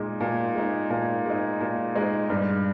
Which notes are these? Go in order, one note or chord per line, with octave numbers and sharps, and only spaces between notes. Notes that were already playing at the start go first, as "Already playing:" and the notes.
Already playing: A#2 G#3 D#4
A#2
G#3 D#4
A#2
G#3 D#4
A#2
G#3 D#4
G2